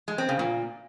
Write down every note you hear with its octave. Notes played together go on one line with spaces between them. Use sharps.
G#3
C4
C#3
A#2